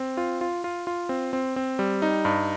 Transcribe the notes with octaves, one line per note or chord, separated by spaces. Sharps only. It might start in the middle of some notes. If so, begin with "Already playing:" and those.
Already playing: C4
F4
F4
F4
F4
C4
C4
C4
G3
D#4
G2